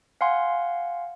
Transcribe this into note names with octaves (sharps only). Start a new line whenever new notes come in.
F5 F#5 G#5 C6